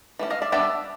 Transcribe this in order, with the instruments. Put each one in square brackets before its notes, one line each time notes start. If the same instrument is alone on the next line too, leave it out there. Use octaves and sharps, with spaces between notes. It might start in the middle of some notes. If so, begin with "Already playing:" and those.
[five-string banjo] E3 A3 C#4
D#5 F5
D5 E5
G3 B3 D4 D5 E5